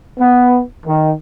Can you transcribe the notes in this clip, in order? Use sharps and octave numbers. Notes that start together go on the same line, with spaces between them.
B3
D#3